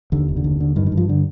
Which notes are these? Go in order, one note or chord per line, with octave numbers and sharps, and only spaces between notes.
D#2 D3
F1
D3
D#2
D3
G2 D#3
D#3
G2
F3
D3